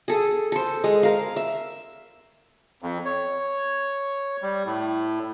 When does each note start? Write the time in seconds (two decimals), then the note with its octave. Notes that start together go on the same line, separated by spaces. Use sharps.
0.08 G#4 A4
0.52 A4 C5
0.84 G#3
1.03 A#4 F5
1.36 E5
2.82 F2
3.05 C#5
4.42 G3
4.66 A2